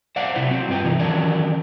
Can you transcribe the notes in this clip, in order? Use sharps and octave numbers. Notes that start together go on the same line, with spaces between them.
C5 D5 F5 F#5
C3 E4 C5
F#3 C4
G2 F4 B4 G5
C3 E3 D#4
D#3 E3 F#3 C#4 D4 A#4